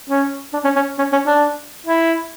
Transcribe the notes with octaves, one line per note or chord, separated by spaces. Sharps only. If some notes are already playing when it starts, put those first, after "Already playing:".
C#4
D4
C#4
C#4
C#4
C#4
D4
E4